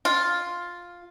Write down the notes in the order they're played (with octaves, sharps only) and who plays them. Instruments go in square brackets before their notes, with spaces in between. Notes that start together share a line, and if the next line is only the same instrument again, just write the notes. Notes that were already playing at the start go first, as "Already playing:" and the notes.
[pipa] F4